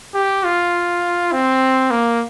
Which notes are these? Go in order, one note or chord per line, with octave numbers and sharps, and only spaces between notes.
G4
F4
C4
A#3